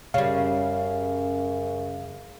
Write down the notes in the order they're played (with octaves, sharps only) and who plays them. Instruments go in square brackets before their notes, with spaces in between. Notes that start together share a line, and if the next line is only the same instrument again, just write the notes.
[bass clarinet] F#2 [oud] C#3 G3 [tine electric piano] F5